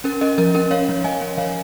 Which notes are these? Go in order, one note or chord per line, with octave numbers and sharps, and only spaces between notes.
C#4 A#4
C#4 A#4 D#5
F3 A#4
C#4 A#4
C#4 C#5 F5
F3
F3 D#5 G#5
C#4
F3 C#5 F5